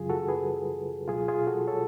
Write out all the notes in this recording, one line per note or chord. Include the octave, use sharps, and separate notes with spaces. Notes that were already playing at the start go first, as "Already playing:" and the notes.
Already playing: F#2 C#3 F#3 F4 G#4
F#4 A4
G#4 B4
C#2 B2 F#3 F4 G#4
F4 G#4
F#4 A4
A4 C#5